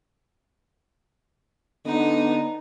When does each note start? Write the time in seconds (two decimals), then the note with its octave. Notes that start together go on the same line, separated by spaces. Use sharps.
1.85 D3 B3 D#4